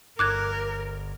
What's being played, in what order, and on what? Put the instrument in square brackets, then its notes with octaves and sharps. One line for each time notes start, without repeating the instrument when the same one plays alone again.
[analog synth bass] G1 [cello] A#4 [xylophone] D6 F#6 G#6